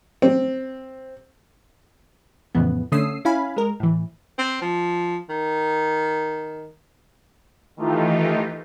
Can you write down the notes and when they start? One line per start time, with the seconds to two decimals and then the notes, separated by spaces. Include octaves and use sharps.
0.22 C4
2.55 F2 A2 C#3 E3 B3
2.92 D3 A3 C#4 D#6 E6 C7
3.25 C#4 E4 F5 G#5 B5
3.57 G#3 A#4
3.80 A2 E3
4.38 C4
4.62 F3
5.30 D#3
7.76 D#3 E3 A3 D#4 F4 G4